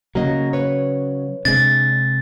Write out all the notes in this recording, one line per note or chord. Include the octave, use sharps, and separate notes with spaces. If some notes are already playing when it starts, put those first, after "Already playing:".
C#3 F#3 A#3 F#4 D#5
B4 C#5
C3 G#3 D4 A6